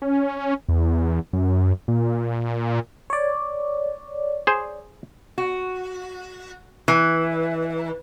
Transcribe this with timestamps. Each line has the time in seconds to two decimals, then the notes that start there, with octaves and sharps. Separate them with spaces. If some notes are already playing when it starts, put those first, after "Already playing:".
0.02 C#4
0.69 E2
1.33 F#2
1.88 A#2
3.10 C#5 D5
4.47 G#4 C5
5.38 F#4
6.88 E3